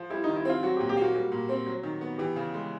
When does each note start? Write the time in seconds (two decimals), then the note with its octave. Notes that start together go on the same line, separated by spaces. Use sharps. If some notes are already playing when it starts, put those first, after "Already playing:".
Already playing: F3
0.10 G3 E4
0.24 D#3 D#4
0.36 E4
0.45 C4 F4
0.63 F#3 F#4
0.76 G4
0.80 A#2
0.89 G4
0.97 A#3 F#4
1.15 G3
1.32 A#2
1.49 C4
1.66 F#3
1.83 D#3
2.01 B3
2.18 E3 G4
2.36 C#3
2.54 G#3